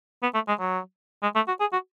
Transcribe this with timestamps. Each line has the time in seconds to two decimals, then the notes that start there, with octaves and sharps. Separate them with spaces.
0.23 B3
0.34 A3
0.48 G#3
0.60 F#3
1.22 G#3
1.35 A3
1.47 F#4
1.60 G#4
1.72 F#4